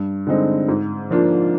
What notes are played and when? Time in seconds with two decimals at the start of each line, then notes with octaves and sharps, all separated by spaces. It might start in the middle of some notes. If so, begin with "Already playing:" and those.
Already playing: G2
0.27 D3 G#3 C4 D#4
0.68 G#2
1.11 F3 A#3 D4 F4